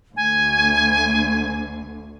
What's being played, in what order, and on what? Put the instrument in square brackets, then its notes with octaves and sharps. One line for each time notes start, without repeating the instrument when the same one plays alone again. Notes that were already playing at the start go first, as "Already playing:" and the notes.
[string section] D2 [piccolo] G#5